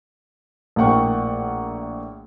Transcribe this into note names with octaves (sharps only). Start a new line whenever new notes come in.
A#1 A2 A#3 F#5 G5 C#6